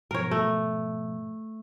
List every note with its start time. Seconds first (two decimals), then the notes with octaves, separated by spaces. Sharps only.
0.11 G#2 B2 F3 A#4 C#5
0.31 A3